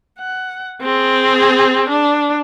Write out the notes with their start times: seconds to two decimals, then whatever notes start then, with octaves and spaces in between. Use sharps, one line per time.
0.19 F#5
0.82 C4 G#4
1.90 D4